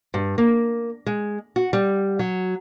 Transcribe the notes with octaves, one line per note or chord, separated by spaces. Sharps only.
G2
A#3
G#3
F#4
G3
F#3